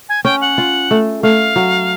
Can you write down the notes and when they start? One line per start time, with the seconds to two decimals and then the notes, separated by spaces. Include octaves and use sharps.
0.09 G#5
0.24 C#4 G5
0.41 F#5
0.58 F4
0.91 A3
1.23 A3 F5
1.56 F#3